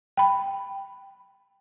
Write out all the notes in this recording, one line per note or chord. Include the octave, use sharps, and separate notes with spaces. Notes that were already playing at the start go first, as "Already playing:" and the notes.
G5 B5